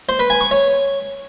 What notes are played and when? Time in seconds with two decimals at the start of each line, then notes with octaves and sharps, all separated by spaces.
0.09 C5
0.19 B4
0.30 G#5
0.41 C#6
0.51 C#5